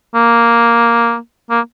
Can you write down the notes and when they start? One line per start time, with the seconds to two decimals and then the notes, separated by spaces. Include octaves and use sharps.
0.15 A#3
1.51 A#3